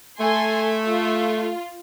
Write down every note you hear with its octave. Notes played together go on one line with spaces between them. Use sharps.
A3 A4 G#5 C6
F4